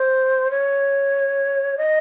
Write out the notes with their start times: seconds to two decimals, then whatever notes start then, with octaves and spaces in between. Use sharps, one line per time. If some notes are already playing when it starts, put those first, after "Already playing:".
Already playing: C5
0.51 C#5
1.78 D#5